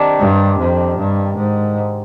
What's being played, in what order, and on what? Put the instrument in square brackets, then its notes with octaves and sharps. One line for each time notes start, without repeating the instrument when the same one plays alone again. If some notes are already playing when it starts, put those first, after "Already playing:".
Already playing: [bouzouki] C3 D#3 D4
[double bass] G2
F2
G2
G#2